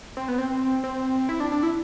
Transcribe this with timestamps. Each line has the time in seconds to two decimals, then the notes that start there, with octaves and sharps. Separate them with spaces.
0.17 C4
0.28 B3
0.38 C4
0.84 C4
1.29 E4
1.40 D4
1.52 D4
1.63 E4